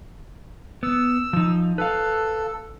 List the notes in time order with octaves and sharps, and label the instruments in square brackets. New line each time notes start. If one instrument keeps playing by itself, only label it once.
[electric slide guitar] B3 [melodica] E6
[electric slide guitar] F3 D#4
[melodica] A4 [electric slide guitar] B4 F5